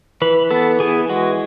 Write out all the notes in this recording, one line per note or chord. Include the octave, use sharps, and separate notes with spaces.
E3 B4
B3 A4
E3 G#4
G#3 F#4